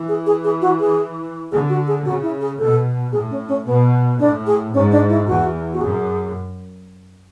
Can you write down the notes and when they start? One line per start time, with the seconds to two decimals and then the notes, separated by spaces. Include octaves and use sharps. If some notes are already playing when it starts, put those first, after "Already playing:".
Already playing: E3
0.09 G#4
0.26 G#4
0.44 G#4
0.62 F#4
0.80 G#4
1.52 D3 G#4
1.69 F#4
1.87 G#4
2.05 C#3 F#4
2.22 E4
2.41 G#4
2.59 B2 A4
3.12 A2 G#4
3.30 C#4
3.48 C#4
3.66 B2 B3
4.20 A2 D4
4.47 G#4
4.74 G#2 C#4
4.91 D4
5.09 E4
5.27 E2 F#4
5.73 F#4
5.81 F#2 G#4